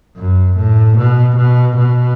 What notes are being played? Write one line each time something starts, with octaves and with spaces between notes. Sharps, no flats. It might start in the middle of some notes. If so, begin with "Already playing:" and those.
F#2
A2
B2
B2
B2